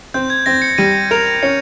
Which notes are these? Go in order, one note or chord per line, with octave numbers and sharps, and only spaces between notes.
C4 G6
G#6
C4 A#6
C#7
G3 D#7
A#4 F7
C#4 C#7